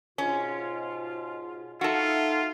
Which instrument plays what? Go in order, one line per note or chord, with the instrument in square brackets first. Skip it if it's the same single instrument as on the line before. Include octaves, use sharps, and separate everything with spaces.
[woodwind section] G#2 B2 F4 [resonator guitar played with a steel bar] C#4
[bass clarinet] D#4 [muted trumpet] F4 [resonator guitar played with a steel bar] F#4 A4 [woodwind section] E5